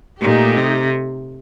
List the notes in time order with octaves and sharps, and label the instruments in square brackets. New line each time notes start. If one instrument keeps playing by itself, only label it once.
[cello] A#2 [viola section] A3 D#4 G4
[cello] C3